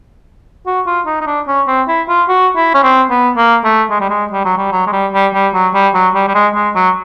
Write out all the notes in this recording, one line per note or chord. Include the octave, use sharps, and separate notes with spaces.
F#4
F4
D#4
D#4
D4
C#4
C4
E4
F4
F#4
E4
C#4
C4
B3
A#3
A3
G#3
G3
G#3
G3
F#3
G3
F#3
G#3
G3
G3
G3
F#3
G3
F#3
G3
G3
G#3
G#3
F#3